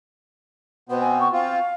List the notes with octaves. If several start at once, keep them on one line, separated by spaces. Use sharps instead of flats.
B2 B3 C4 B4
G#5
C#6
C4 F4 F5